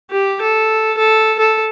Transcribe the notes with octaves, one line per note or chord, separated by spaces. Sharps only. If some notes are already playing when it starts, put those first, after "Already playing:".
G4
A4
A4
A4